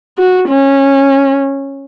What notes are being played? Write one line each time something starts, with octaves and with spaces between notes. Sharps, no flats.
F#4
C#4